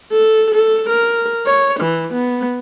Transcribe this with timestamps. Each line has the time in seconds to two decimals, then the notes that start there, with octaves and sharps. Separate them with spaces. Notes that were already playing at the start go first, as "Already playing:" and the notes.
0.12 A4
0.55 A4
0.89 A#4
1.46 C#5
1.80 E3
2.13 B3